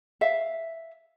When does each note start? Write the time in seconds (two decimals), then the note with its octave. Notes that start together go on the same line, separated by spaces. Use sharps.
0.21 E5 F5